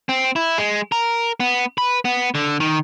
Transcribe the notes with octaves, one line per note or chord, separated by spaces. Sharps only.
C4
E4
G#3
A#4
B3
B4
B3
D3
D#3